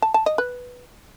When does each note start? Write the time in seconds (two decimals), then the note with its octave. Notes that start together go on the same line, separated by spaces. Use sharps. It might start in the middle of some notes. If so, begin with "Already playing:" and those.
0.02 A5
0.14 A5
0.26 D#5
0.38 B4